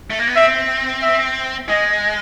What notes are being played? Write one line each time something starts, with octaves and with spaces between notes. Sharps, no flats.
A3
A#3
B3
C4 E5
E5
G#3 D#5